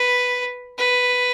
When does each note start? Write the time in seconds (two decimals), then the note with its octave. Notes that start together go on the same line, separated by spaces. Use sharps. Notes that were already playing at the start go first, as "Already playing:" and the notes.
Already playing: B4
0.78 B4